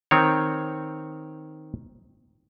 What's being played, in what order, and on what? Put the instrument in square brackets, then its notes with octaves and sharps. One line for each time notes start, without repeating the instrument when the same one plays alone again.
[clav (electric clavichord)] D#3 C4 C#5